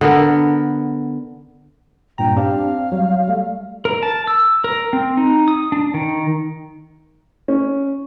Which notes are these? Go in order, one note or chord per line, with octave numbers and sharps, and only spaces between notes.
D3 B3 A#4
G2 A#2 G5 A#5
C4 D4 G4 F5
F#3 G3
G3 A3
A#4
A5
E6
A#4
C4
D#4
D#6
D4
D#3
C#4